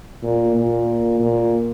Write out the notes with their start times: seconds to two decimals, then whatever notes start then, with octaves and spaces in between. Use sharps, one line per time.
0.23 A#2
0.56 A#2
1.20 A#2